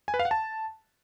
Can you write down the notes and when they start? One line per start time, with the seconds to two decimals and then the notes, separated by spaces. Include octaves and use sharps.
0.08 G#5
0.14 B4
0.19 F5
0.25 F#5
0.31 A5